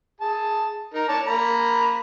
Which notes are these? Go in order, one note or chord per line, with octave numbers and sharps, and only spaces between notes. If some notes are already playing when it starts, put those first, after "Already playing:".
G#4 A5
D#4 A#4
C#5 D5 A5
A#3 A#5 B5